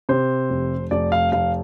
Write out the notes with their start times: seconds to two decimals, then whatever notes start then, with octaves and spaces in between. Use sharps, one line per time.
0.09 C3 C5
0.50 F1
0.91 F1 D5
1.12 F5
1.32 F1 F5